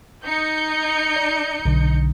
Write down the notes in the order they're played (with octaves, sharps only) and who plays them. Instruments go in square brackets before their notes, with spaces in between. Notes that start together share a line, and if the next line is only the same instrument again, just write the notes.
[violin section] D#4 G6 C#7
[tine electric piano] D5
B1 D3